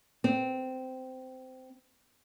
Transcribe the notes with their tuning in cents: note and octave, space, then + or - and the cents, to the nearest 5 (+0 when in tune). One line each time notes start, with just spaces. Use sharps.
C4 -15